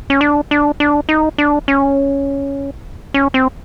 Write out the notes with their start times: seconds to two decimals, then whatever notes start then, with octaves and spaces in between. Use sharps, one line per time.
0.10 C#4
0.21 D4
0.51 D4
0.80 D4
1.09 D#4
1.38 D4
1.68 C#4
3.14 C#4
3.34 C4